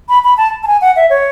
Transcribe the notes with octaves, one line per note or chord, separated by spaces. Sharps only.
B5
B5
A5
A5
G#5
F#5
E5
C#5